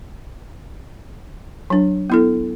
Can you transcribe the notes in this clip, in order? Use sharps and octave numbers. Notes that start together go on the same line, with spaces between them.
F#3 D4
B3 E4 A4